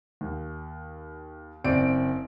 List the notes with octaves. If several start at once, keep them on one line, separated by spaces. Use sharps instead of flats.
D#2
F#1 C4 D5 D7